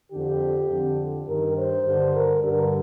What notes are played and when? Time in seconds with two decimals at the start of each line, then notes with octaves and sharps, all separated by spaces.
0.12 F2 D3 G4
0.70 F2 D3
1.28 G2 D#3 A#4
1.57 C5
1.86 G2 D3
2.14 A#4
2.43 G2 D3 A#4